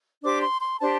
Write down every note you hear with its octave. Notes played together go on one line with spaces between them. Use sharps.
D4 G4 C5 D6
C6
C6
D4 G4 C5 A5